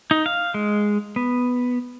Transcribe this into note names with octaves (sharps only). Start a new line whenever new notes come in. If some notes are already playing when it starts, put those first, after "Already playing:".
D#4
F5
G#3
B3